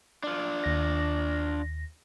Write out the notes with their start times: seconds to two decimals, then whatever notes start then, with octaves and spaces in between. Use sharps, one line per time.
0.23 D4 F4
0.64 D#2 A#6